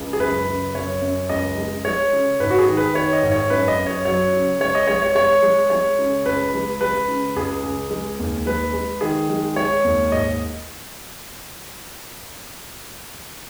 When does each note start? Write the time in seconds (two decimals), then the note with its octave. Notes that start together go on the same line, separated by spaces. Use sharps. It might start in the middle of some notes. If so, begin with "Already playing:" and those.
Already playing: C#2
0.13 G#4
0.20 F#2 B4
0.47 C#3
0.74 F#2 C#5
1.02 F#2
1.29 C#2 D#5
1.58 G#3
1.85 G#3 C#5
2.13 C#3
2.40 G#2 B4
2.50 F#4
2.59 G#4
2.68 D#3
2.77 B4
2.94 D#3 C#5
3.13 D#5
3.23 G#2
3.32 C#5
3.50 F#2 B4
3.68 D#5
3.78 F#2
3.87 C#5
4.05 F#3 C#5
4.33 C#3
4.60 G#3 C#5
4.75 D#5
4.87 G#3 C#5
5.02 C#5
5.15 G#3 C#5
5.43 G#3
5.70 G#3 C#5
5.99 C#3
6.26 C#2 B4
6.54 G#3
6.81 G#3 B4
7.08 C#3
7.36 C#2 G#4
7.63 C#2
7.91 G#3
8.19 D#2
8.46 G#3 B4
8.73 G#3
9.01 D#3 G#4
9.29 G#3
9.56 G#3 C#5
9.84 D#2
10.12 G#2 D#5